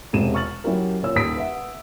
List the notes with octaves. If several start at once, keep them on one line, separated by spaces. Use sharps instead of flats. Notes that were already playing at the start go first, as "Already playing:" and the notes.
E1 C3 G#3 D#7 E7
C#6 F6 A6 F#7
F#3 C#4 E4 F#4 G4 A#4
A#2 C#5 E6
D#1 D#2 D#6 B6 D7
B4 E5 F#5